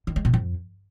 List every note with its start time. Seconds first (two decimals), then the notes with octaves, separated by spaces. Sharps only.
0.07 D#3
0.16 G#3
0.25 B2
0.34 F2